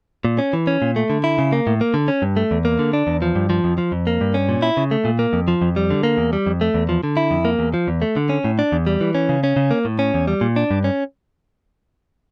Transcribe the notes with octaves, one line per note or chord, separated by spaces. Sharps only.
A#2
C#4
E3
C#4
A#2
A3
D3
E4
C#3
A#3
A2
A#3
D3
C#4
G2
A3
E2
A#3
D3
D4
E2
F3
G2
F3
F2
F3
F2
A#3
G2
C#4
A#2
E4
C#3
A3
A#2
A#3
F2
F3
F2
G3
D3
A#3
E2
G3
F2
A3
E2
F3
D3
E4
F2
A#3
E2
F3
E2
A3
D3
C#4
A2
D4
E2
G3
E3
C#4
C#3
C#4
C#3
A#3
A2
C#4
E2
G3
A#2
D4
G2
C#4